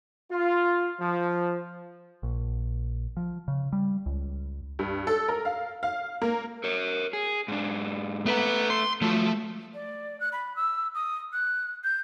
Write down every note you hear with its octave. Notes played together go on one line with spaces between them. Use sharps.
F4
F3
A#1
F3
C#3
G3
C#2
G2
A4
A#4
F5
F5
A#3
A#4 C#5
G#4
G#2 D4
A3 B3 B4 A#5
C6
F3 F#3 A3 F4
D5
F#6
B5
E6
D#6
F#6
G6